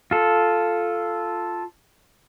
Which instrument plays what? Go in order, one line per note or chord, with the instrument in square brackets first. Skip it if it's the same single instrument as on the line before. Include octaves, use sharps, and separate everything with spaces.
[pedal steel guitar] F4 A4